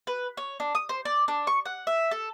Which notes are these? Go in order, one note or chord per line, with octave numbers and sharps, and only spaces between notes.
B4
C#5
D4
D#6
C5
D5
D4
C#6
F#5
E5
A4